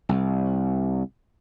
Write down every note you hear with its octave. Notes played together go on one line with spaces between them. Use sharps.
C2